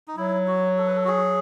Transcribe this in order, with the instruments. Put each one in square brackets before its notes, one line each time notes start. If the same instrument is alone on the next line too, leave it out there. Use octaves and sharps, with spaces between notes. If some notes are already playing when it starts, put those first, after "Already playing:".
[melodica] D#4
[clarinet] F#3 [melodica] E4
[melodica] F#4
A4
B4
A4
F#4
G#4